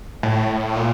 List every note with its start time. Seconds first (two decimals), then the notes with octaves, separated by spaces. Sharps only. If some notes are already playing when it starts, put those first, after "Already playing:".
0.23 A2
0.76 A#2